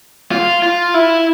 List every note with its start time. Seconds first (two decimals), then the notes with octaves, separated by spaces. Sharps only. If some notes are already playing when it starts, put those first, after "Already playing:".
0.31 F4
0.63 F4
0.94 E4